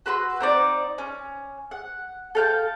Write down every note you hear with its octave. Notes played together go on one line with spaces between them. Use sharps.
F#4 B4 C6 E6
C4 D#4 D5
C#4
F#5
A4 F5 G5